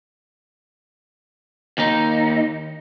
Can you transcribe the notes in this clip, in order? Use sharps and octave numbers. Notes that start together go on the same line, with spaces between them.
D#2 D#4